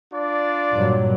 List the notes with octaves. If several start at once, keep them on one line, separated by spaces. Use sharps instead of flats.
D4 F4 D5
G2 A#2 F#3